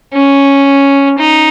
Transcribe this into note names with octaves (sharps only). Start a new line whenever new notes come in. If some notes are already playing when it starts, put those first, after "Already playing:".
C#4
D#4